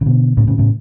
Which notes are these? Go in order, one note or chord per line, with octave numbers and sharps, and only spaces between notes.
C#3
B2 D3
A2 C#3
A2 C#3
A2 C#3